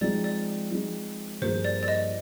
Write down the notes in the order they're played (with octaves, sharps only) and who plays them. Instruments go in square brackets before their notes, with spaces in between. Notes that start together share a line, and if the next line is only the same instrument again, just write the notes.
[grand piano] F3 G#3 C4 D#4 G#4 [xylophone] D5
[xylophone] D5
[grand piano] F3 G#3 C4 D#4 G#4
[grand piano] G2 F3 A#3 F4 G#4 [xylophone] C5
[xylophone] D5
D5
D#5